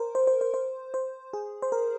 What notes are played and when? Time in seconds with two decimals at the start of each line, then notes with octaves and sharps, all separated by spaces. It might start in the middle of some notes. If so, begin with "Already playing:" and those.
Already playing: A#4 C5
0.15 C5
0.27 C5
0.41 C5
0.54 C5
0.94 C5
1.33 G#4
1.62 C5
1.72 A#4